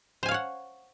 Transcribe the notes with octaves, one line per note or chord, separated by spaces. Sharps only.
C5 C#5 F5 F#5 G#5